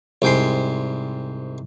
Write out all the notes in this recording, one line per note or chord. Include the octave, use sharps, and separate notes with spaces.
C2 G#2 G5 G#5 C6